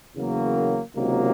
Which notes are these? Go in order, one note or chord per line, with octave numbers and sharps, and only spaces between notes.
E2 C#3 F#3 A#3
C#2 C3 D#3 F#3 A#3